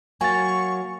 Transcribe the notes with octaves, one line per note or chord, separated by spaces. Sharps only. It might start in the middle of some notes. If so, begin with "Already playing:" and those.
F#3 A#3 G#5 C#6 A6